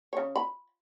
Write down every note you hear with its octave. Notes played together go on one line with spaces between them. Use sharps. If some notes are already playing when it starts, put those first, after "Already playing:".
C#3 C#5
B5